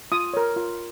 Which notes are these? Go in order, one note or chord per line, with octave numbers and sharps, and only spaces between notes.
F4 D#6
A#4 C#5
F4